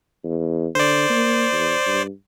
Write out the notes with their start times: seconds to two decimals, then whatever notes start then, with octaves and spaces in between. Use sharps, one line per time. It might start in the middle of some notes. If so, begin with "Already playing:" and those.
0.24 E2
0.75 D3 C5 D5
1.09 A#3
1.52 E2
1.87 G2